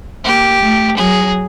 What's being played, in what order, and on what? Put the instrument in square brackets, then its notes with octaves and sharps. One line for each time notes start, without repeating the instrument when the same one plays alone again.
[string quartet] A#3 [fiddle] G4
[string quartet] A3
[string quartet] F#3 [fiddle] G#4